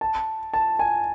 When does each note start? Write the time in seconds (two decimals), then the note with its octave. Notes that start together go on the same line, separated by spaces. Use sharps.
0.01 A5
0.54 A5
0.79 G#5